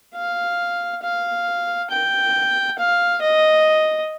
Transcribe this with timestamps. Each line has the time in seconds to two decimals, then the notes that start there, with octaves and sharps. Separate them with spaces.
0.15 F5
1.03 F5
1.90 G5
2.79 F5
3.22 D#5